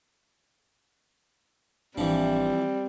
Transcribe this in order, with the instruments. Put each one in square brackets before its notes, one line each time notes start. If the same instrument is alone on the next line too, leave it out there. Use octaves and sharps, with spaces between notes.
[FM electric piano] G#1 D4 [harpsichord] E3 F3 [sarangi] G3 [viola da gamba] C4